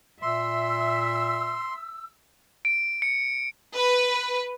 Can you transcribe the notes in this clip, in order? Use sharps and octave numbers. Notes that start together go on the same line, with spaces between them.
A#2 E5 C6 E6
D7
C#7
B4